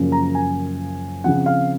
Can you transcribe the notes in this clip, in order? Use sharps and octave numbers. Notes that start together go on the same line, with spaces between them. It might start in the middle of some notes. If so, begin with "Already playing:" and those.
Already playing: F#2 C#3 F3 A#3 C#4
A#5
G#5
C#3 F3 C4 F#5
F5